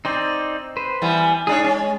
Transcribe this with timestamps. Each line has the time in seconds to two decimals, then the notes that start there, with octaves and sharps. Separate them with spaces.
0.05 C4 D#4 C5 D5
0.77 B4 C5
1.02 E3 G3 B3
1.47 G#2 D4 G#4 C#5
1.64 G#3 C#4